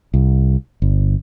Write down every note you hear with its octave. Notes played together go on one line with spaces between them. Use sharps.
C2
G1